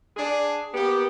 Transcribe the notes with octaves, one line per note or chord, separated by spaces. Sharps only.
D4 G#4
A#3 B3 G4